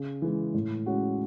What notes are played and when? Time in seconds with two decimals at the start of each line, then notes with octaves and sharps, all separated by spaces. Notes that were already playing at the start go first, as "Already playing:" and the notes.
Already playing: C#3
0.22 E3 G#3
0.54 A2
0.86 G#3 C#4 F#4